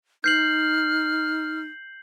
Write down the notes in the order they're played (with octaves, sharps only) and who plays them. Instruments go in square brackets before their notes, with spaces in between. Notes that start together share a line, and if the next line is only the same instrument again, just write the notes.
[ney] D#4 [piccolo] F6 [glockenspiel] G6 C7 F#7